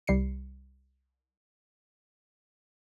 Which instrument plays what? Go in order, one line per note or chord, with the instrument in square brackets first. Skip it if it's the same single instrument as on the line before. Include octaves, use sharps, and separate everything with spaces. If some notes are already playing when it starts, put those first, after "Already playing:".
[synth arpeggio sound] C2 G3 C7 C#7